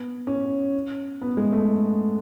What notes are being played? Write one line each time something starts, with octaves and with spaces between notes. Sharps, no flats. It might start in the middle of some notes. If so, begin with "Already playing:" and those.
Already playing: B3
C#4
B3
G#3
A3